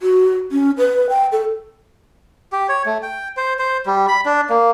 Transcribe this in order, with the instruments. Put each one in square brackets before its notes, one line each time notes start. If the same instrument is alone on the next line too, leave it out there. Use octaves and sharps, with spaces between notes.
[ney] F#4
C#4
B4
G5
A4
[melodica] G4
C#5
A3
G5
C5
C5
G3
B5
D4
A#3